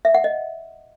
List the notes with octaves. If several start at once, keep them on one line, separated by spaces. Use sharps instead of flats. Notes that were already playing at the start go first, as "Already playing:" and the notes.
E5
F#5
D#5